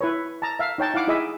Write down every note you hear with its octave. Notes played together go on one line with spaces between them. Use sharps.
E4 B4 C#5
A5 A#5
E5 F5
D#4 C#5 G5 A5
E4 F5 F#5 D6
E4 G#4 D#5 E5 D6